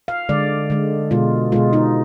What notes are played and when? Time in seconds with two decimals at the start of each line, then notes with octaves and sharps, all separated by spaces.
0.08 F5
0.29 D3 G#3 D5
0.70 D3 G#3
1.11 B2 G#3 F4
1.52 B2 G#3 F4
1.73 D#4